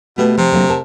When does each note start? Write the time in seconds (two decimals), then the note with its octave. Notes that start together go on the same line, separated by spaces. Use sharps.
0.18 B2 A3 G4 B4
0.37 C3 F3
0.52 D3 F#3 A#3
0.69 A#4 A5